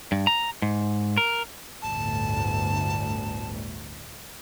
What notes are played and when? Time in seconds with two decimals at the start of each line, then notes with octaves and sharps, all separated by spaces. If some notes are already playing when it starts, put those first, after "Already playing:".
0.12 G2
0.27 A#5
0.62 G#2
1.17 A#4
1.82 G1 D2 A2 A5